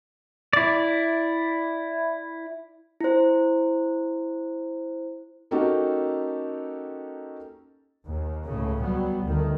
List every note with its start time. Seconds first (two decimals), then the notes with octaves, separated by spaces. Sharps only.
0.53 E4 D5
3.01 E4 C5
5.51 A#3 C#4 D#4 F#4 G4 A4
8.07 D#2
8.46 C#2 A2 C#3
8.82 F#3 G3 B3
9.23 D2 D#3